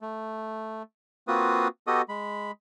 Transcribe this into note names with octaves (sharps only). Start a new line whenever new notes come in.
A3
A#3 C4 F4 F#4 B4 D#6
B3 F#4 G4 A4 D#5 D#6
G#3 B5